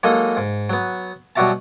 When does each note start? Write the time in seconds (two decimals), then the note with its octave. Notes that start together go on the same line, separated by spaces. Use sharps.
0.03 F#3 G#3 A#3 D#4 A4 D#5
0.37 G#2
0.70 F#3 B3
1.36 B2 F#3 G3 F#4 E5 A5